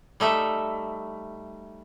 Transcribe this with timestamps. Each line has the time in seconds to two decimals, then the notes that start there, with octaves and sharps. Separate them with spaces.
0.20 G3 A3 D#4 E5